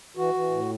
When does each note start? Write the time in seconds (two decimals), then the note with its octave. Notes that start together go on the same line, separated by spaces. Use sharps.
0.17 E3 F#4
0.34 E3
0.51 A2